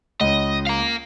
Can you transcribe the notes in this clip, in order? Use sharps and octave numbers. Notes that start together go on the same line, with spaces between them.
C#2 C#4 D#5
F5 A#5